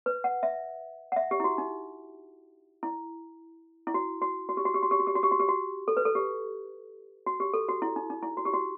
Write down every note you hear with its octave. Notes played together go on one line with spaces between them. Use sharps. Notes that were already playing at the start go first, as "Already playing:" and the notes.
B4
F#5
E5
F#5
E5
G4
E4
F#4
D#4
E4
E4
F#4
F#4
F#4
G4
F#4
G4
F#4
G4
F#4
G4
F#4
G4
F#4
G4
F#4
A4
B4
A4
G4
F#4
G4
A4
F#4
E4
D#4
D#4
E4
F#4
G4
F#4